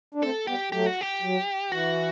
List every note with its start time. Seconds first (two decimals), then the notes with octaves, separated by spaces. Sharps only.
0.15 D4
0.22 A3 C4 A4
0.47 G3 B3 G4
0.72 F#3 A3 G4
0.86 F#4
1.01 G4
1.22 F#3
1.72 E3 F#4